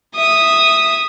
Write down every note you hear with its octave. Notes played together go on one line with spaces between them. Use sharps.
E5 D#6